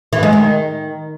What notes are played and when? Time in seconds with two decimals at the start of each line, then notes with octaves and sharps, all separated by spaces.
0.13 E3
0.23 G#3
0.33 D#3